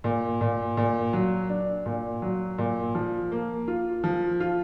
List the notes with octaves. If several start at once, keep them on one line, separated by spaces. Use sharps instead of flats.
A#2
A#2
A#2
F#3
D4
A#2
F#3
A#2
F3
A#3
F4
F3
F4